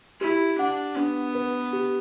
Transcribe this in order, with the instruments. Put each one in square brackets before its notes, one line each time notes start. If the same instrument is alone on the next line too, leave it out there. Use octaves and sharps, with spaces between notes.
[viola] E4 [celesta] G4
[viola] D4 [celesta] F#5
[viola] B3 [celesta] D4
[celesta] B4
G4